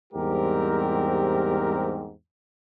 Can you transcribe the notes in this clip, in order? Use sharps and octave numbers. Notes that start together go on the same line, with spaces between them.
E2 G#2 G3 C4 G4 A#4